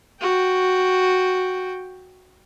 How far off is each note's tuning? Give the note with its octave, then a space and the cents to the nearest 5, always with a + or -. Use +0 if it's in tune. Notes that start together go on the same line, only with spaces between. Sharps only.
F#4 +0 G5 +0